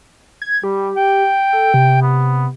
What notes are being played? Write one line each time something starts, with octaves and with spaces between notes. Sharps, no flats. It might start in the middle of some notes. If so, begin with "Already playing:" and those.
G#6
G3 G4
G5
A4
C3
B3